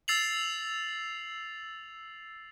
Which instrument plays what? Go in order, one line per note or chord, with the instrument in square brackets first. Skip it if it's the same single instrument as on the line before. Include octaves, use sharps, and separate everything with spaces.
[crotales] E6 A6 C7 F7 F#7